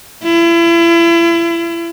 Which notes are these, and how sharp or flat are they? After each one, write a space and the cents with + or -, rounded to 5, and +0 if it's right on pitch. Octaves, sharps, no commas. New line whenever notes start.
E4 +35